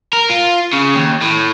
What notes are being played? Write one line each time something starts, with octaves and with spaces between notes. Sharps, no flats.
A#4
F4
C#3
D#2
A2